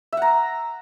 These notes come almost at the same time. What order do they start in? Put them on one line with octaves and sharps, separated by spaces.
E5 F#5 A#5